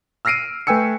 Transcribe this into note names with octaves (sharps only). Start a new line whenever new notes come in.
E6 F6 A#6 C7 D7 D#7
A3 B4 G5 G#5 E6 C#7